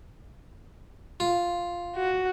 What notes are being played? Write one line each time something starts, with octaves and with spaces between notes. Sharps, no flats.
F4
F#4